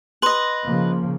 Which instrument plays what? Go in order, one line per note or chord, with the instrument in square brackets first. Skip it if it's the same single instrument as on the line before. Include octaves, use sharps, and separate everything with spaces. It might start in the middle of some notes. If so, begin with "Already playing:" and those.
[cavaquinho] B4 D#5 [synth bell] C6 F#7
[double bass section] C#3 F3 A#3